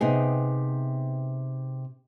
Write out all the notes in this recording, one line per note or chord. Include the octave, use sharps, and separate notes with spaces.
C3 B3 D#4 G#4